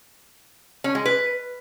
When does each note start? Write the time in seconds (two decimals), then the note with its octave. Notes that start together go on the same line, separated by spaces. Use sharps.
0.84 C#4
0.95 G#3
1.06 B4